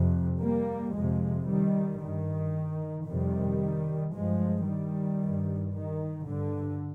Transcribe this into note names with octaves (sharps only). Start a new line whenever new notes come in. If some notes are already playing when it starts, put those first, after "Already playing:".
Already playing: F2 C3
G3 A#3
F2 C3 F3 G#3
D#3 G3
G2 D#3
F2 C3 D#3 G3
G2 F3 G#3
D#3 G3
G2
D#3
G2 D3